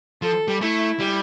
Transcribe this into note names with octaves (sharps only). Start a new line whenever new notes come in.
F3 A4
G3
A3 E4
G3